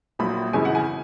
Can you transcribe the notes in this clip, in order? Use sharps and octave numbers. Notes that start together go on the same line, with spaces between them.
A#1 A#2 F#3 B5
G#1 F#2 C#3 E3 G#5
F#5
G#5